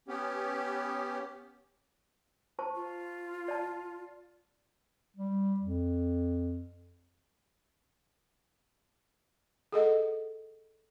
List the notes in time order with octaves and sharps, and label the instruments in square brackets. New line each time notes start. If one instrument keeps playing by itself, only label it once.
[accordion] B3 C#4 G4
[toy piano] C5 A5 C#6
[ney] F4
[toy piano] D5 A5
[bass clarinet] G3
F2
[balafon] G#4 A4 D#5 F#5